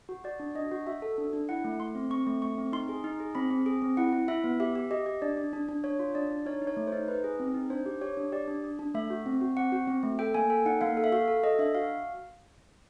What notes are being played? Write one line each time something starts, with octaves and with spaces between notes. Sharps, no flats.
F#4
F#4 D5
D4
D4 D#5
F#4
F#4 E5
A4
D4
D4
E4 F#5
A3
A3 C6
C4
C4 C#6
A3
A3 C#6
C4
D#4 C6
G#4
D#4
G#4
C4 B5
C4
G#4
C4
E4 F#5
E4
E4 E5
B3
G4 E5
G4
G4 D#5
G4
D4 D5
D4
D4
D4
D4 C#5
F4
D4 D5
D4
D#4 C#5
D#4
C#5
A3
C5
D#4
D#4 B4
G#4
C4
D#4
D4 C5
G4
G4 C#5
D4
G4 D5
D4
D4
D4
A3 E5
F#4
C4
F#4
C4 F#5
F#4
C4
A3
A4 G5
A#3 G#5
A4 G5
D#4 F#5
A#3 F5
A4
E5
F#4 F5
A4
A4 D#5
D4 E5
F#4 F5